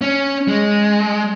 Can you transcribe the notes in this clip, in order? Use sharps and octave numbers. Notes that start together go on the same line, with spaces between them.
C#4
G#3